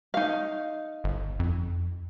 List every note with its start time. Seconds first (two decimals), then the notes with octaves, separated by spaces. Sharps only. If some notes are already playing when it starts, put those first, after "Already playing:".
0.14 D#4 F5
1.04 G1
1.40 F2